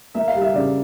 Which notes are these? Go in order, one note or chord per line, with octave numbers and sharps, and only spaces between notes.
A#3 E5
F5
G3
E5
C#3 D5